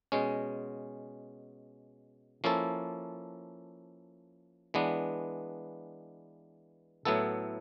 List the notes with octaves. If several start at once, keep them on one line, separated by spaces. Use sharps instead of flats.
B2 G#3 C#4
F3 A#3 C#4 E4 A4
E3 G#3 B3 D4
A2 F#3 B3 E4 A4